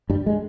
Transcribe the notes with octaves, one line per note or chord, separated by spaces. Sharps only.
G2 G3
G#3